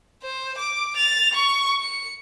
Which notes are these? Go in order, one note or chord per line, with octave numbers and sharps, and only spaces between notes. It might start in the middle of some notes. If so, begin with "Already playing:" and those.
C5
D6
A6 F7
C#6
C#7